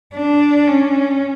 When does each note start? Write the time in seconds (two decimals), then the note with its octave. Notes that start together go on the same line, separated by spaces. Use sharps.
0.14 D4
0.68 C#4